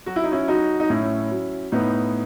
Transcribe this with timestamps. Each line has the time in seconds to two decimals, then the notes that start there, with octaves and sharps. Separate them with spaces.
0.06 F#3 F#4
0.16 E4
0.24 D#4
0.32 C#4 E4
0.48 F#3 D#4 F#4
0.80 D#4
0.89 A2 C#4 E4
1.31 F#3
1.72 A2 B3 D#4